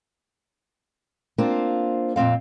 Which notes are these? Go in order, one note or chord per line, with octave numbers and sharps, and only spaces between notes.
A#3 C4 D4 F4 C5
F2 A#2 F#3 C4 F5